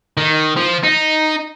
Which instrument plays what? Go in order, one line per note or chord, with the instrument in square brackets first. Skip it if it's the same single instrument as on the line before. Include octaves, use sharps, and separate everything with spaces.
[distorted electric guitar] D#3
F3
D#4